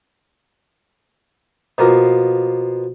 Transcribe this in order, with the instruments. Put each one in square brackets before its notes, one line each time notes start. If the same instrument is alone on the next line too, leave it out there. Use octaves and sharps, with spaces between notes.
[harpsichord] B2 F3 A#3 A#4